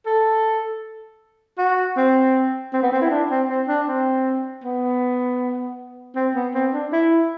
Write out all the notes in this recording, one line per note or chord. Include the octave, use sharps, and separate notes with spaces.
A4
F#4
C4
C4
B3
C4
E4
D4
C4
C4
D4
C4
B3
C4
B3
C4
D4
E4